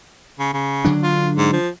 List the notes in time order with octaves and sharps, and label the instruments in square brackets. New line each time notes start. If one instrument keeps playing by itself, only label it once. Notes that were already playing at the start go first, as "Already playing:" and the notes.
[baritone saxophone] C#3
C#3
[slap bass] D3 F#3 D4
[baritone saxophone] F4
G#2
F3